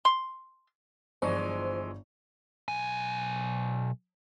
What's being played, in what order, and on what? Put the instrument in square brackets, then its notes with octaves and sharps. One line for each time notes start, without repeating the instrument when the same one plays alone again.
[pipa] C6
[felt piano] G1 D5 C#6 [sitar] E3 F3 G#3 [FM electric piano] C5
[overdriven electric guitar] B1 G#5